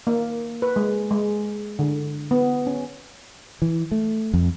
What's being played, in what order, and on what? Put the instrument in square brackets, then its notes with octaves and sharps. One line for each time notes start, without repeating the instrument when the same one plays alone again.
[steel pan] A#3
B4
G#3
G#3
D3
B3
C#4
[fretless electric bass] E3
A3
F2